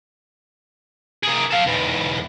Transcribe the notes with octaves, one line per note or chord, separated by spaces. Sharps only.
A#3 G#4
A4 F5
E2 G#2